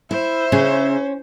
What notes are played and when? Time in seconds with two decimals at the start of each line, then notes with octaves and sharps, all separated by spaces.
0.11 E4 C5 E5
0.52 C#3 C#4